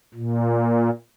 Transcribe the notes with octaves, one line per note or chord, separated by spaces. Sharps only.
A#2